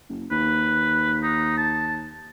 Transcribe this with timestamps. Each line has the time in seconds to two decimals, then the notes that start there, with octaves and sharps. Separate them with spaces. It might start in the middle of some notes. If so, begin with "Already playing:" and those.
0.09 F#1
0.31 D#2 B4
1.23 D#4
1.58 A5